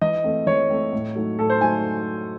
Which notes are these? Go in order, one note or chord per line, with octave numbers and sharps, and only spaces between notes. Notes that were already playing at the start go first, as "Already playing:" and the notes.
E3 D#5
A3 C4
E3 C#5
A3 C4
A2
F#3 A3 D#4
A2 A4
C5
F#3 A3 D#4 G#5